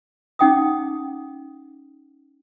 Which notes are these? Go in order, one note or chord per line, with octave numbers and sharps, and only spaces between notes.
C#4 D#4 F#5 G5 D6 D#6